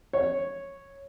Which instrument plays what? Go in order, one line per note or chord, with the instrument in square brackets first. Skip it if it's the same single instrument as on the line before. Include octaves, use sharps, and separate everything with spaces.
[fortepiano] C#5